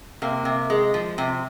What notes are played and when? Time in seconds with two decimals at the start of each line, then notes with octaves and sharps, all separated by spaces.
0.22 C3 A#3
0.45 C3
0.70 G#3
0.94 F3
1.18 C3